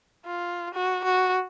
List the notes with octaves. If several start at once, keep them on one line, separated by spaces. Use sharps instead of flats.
F4
F#4
F#4